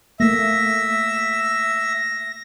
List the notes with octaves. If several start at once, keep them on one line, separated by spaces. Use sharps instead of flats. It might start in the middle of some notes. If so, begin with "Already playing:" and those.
A3 A#3 E5 A#6